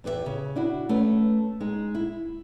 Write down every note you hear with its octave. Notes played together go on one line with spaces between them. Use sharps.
E2 G4 B4 C#5 E5
C#3
D4 E4 F#4
A3 C#4 B4
G#3 D#4
E4